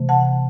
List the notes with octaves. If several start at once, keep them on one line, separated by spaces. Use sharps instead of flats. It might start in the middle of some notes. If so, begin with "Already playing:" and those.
Already playing: C3 E3 A3
F#5 A5